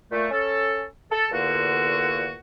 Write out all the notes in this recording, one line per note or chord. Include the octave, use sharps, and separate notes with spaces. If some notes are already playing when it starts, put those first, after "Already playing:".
A#2 A3
C#4 A4
A4
E2 A#2 D3 A#3 F#4